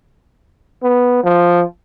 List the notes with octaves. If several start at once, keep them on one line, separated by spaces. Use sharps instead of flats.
B3
F3